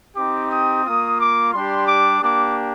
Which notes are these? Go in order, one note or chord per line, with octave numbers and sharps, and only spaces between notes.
C4 D#4 G4 D6
D#6
A#3 F4 D#6
D6
G3 D4 G4 C6
D6
A#3 D4 G4 D6